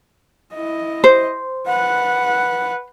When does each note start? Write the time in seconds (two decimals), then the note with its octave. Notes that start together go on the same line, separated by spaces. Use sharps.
0.54 E4 D#5
1.04 C5
1.68 B4 F#5